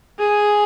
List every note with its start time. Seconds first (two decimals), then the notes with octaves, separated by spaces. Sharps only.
0.19 G#4